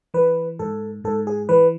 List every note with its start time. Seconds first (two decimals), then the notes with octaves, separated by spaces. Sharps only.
0.14 E3 B4
0.59 G#2 A4
1.04 G#2 A4
1.27 G#4
1.49 E3 B4